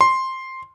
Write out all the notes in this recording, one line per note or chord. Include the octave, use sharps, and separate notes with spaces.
C6